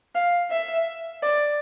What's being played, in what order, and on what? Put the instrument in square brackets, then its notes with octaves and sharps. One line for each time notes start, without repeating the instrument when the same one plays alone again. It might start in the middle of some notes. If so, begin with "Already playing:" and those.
[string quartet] F5
E5
D5